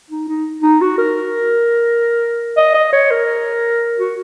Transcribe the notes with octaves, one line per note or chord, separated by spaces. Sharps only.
D#4
D#4
D#4
F#4
A#4
D#5
D#5
C#5
A#4
F#4